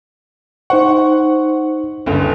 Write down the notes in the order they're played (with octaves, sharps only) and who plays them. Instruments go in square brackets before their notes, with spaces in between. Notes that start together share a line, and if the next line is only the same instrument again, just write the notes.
[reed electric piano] D#4 C5 C#6 [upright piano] F#5
[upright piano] G1 C#2 D3